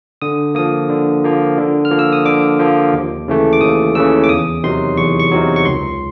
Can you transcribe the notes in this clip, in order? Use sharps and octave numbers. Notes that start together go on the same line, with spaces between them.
D3 D#6
F3 A#3 D#6
D3
F3 A#3
D3
F6
F3 A#3
E6
D#6
D3 D6
F3 A#3
D#2
C#3 E3 A3
D6
D#2 D#6
C#3 E3 A3 E6
D6
E2 D#6
C3 D#3 F#3 C6
E2 C#6
C#6
C3 D#3 F#3
C#6
C#2 C6